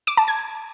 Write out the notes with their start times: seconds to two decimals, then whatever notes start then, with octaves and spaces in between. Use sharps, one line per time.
0.07 D6
0.17 A5
0.28 G#6